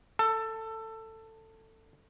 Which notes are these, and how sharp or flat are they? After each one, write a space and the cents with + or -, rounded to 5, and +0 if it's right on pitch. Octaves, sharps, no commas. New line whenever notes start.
A4 +15